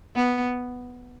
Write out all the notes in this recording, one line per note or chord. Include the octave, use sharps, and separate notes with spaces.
B3